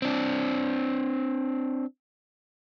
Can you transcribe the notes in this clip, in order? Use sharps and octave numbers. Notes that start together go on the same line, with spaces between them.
C4 D4